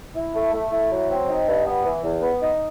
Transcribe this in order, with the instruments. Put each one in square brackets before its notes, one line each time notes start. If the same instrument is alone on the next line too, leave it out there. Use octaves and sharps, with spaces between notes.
[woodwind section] E4
A3
A3
E4
F#3
C4
D#4
G2
B3
E3
E2
B3
D#4